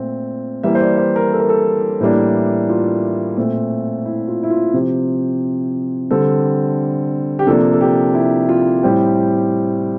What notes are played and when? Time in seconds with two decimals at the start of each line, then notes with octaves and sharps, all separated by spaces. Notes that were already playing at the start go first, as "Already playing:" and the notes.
Already playing: A#2 A3 C4
0.63 E3 G3 A#3 E5
0.75 C5
0.81 D5
0.98 C5
1.16 A#4
1.33 A4
1.40 A#4
1.49 A4
2.01 A2 E3 G3 A#3 D4
2.69 F4
3.37 A#2 A3 C4
4.06 E4
4.28 F4
4.43 E4
4.50 F4
4.74 C3 F3 C4 G4
6.11 D3 G3 C4 A4
7.39 G4
7.46 C3 F3 A#3 D4 A4
7.73 A4
7.81 G4
8.15 E4
8.49 F4
8.83 A2 G3 C4 G4